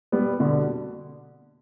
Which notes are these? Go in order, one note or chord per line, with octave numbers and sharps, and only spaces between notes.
G3 B3
B2 D3